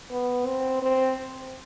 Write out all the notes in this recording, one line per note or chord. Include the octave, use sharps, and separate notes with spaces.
B3
C4
C4